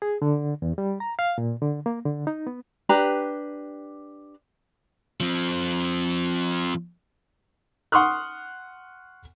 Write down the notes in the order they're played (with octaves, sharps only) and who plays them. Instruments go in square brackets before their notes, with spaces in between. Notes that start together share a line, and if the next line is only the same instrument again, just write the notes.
[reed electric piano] G#4
D3
E2
G3
A#5
F5
A#2
D3
A#3
D3
D#4
B3
[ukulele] D4 G4 B4 A#5
[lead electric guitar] F3 C4
[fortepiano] F#5 C6 C#6 D#6 F6 F#6